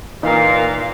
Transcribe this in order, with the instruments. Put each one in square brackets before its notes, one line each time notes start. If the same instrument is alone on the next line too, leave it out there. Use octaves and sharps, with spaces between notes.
[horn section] A#2 [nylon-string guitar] E3 [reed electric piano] D#4 A#4 [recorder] F5